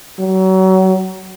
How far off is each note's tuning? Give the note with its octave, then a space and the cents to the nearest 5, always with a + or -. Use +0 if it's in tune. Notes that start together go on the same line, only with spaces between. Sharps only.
F#3 +30